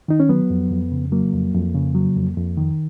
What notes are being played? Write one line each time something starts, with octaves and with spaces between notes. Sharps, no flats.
D#3 D#4
C#4
F#3 B3
F2
F2
C#3
F#3 A#3
F2
F2
C#3
F#3
F2
F2
D#3